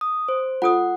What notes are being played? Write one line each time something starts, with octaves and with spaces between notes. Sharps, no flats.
D#6
C5
F4 A4 F#5 D#6